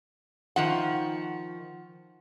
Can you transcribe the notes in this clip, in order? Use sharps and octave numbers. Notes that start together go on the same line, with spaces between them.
D#3 F3 F#5